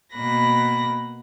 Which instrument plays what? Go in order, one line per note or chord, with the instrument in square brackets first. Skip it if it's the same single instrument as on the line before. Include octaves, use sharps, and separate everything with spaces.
[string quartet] B2 A#3 B5 F#6 A#6